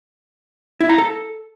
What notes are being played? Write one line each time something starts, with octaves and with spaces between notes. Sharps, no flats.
E4
A#5
A4